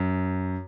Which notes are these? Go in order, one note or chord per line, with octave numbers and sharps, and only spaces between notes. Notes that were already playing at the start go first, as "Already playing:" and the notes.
Already playing: F#2